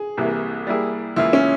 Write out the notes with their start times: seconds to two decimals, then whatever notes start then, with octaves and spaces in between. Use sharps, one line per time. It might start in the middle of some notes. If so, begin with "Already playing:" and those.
Already playing: G#4
0.17 C2 C3 E3 A#3
0.67 G3 A#3 E4 G#4
1.16 C#2 C#3 E3 A#3 E4 F4
1.33 C#4